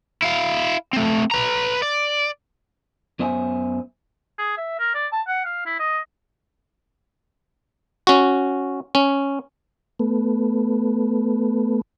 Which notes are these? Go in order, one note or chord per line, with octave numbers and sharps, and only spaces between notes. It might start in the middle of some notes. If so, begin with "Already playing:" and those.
E4 F5
A3 C4
B4 A#5
D5
F#2 B3 C5 E5 G#5
G#4
E5
A#4
D5
A5
F#5
F5
E4
D#5
C#4 F#4
C#4
A3 B3